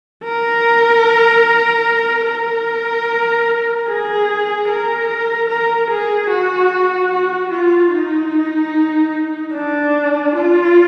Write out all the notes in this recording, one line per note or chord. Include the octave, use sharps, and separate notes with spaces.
A#4
A#4
G#4
A#4
A#4
G#4
F#4
F#4
F4
D#4
D4
F4